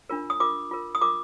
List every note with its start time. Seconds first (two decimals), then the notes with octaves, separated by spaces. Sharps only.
0.09 D4 F4 A#4
0.30 D#6
0.40 F4 A#4 D6
0.71 F4 A#4
0.95 D#6
1.01 F4 A#4 D6